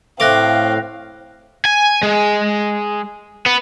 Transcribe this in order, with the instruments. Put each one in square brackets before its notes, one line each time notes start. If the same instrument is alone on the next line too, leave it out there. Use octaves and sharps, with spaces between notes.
[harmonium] A2 F5 [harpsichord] A3 D6 [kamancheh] C4 [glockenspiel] F#6 A#6 F7
[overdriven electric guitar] G#5
G#3
B3